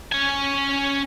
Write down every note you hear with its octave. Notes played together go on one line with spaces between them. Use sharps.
C#4 G#5